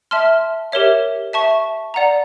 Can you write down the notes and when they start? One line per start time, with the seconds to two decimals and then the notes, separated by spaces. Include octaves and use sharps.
0.11 E5 A5 C6 F6
0.72 G4 A#4 C#5 E5
1.33 E5 A5 C#6
1.94 D5 F#5 A#5